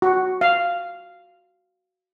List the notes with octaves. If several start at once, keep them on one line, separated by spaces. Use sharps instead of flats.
F#4
F5